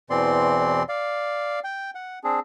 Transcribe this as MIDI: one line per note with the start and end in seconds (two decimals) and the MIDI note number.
0.10 0.83 40
0.10 0.83 47
0.10 0.83 52
0.10 0.83 60
0.10 0.83 74
0.10 0.83 84
0.89 1.60 74
0.89 1.60 77
1.64 1.91 79
1.95 2.19 78
2.24 2.40 60
2.24 2.40 62
2.24 2.40 68